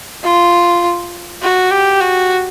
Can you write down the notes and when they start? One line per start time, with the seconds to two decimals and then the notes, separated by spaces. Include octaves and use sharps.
0.23 F4
1.42 F#4
1.71 G4
2.01 F#4